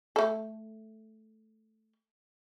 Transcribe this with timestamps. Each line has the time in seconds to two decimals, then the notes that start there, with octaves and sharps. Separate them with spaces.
0.16 A3 A4